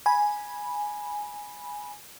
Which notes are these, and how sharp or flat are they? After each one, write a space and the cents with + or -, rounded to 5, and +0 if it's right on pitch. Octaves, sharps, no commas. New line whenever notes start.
G#5 +0 B5 -10